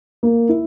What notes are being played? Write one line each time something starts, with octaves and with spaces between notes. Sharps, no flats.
A#3
E4